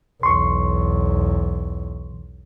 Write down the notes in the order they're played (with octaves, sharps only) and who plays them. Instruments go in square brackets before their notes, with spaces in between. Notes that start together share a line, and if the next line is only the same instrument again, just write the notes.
[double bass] B1 E2 [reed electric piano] C6 C#6